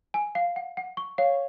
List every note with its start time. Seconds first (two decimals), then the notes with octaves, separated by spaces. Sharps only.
0.14 G#5
0.35 F5
0.56 F#5
0.77 F#5
0.97 C#6
1.18 C#5 F5